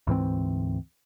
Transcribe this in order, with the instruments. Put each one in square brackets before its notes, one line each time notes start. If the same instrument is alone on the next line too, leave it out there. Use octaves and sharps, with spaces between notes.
[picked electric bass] D2 G#2 E3 C4